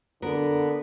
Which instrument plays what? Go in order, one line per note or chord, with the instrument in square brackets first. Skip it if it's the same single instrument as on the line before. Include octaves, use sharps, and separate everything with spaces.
[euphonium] D3 [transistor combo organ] B3 [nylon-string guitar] A#4